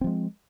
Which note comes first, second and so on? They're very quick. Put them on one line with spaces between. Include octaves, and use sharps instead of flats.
C4 F3 G#3